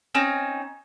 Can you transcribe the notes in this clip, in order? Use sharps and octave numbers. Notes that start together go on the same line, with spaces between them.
C4 C#4 D#4